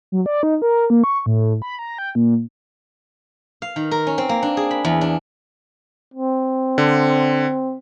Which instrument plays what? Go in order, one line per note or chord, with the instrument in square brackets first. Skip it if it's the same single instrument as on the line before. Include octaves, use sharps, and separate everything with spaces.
[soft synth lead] F#3
D5
D#4
A#4
A#3
C#6
A2
B5
A#5
G5
A#2
[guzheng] F5
D#3
A#4
C#4
C4
A#3
D4
G#4
B5
E2
D4
[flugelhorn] C4
[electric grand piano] D3